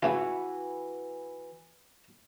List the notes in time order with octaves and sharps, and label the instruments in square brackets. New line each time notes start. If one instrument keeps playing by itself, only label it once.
[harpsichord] C#3 A3 F4 [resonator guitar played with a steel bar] E3 F#4 B4